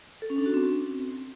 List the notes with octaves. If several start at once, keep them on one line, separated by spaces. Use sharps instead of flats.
A4
C#4
D4
F#4
C4